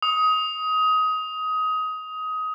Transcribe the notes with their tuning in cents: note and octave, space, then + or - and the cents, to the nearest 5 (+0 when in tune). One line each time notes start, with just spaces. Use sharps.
D#6 +20